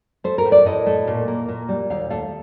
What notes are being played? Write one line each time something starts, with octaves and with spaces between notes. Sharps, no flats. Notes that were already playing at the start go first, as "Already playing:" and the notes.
A3 C5
A#4
A2
D5
A2 D#5
A3
A#2
A#3
A#2
G3
D#2 F5
A3 F5